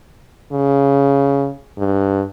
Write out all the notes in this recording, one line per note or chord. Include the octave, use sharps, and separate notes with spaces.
C#3
G2